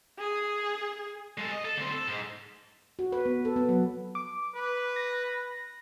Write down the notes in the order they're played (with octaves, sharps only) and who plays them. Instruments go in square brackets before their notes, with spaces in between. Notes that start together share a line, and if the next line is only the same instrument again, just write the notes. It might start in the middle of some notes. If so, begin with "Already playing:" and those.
[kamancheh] G#4
[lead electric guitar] G#3 A4
D#5
A4
D2 C4
A4
G#2 G#3
[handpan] F#4
B4
B3
A4
B3
F#3
[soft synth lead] D6
[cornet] B4
[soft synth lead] A#6